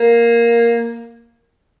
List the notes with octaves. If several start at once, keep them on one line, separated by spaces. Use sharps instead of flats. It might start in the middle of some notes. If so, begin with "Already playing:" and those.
Already playing: A#3